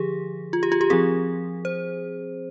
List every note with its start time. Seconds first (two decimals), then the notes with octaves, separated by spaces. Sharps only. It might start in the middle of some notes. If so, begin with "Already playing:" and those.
Already playing: D3 F3 G4 G#4
0.53 F4
0.63 G4
0.72 F4
0.81 G4
0.90 F3 C4 G#4
1.65 C5